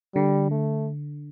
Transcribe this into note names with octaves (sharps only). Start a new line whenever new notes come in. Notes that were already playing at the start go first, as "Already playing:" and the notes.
D3 G3
A3